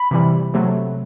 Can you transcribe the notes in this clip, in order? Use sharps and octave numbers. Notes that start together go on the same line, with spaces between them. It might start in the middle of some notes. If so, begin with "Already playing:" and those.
Already playing: B5
C3 E3 G3
C3 F#3 A3